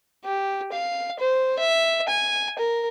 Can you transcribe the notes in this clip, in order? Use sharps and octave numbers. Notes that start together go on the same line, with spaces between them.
G4
F5
C5
E5
G#5
A#4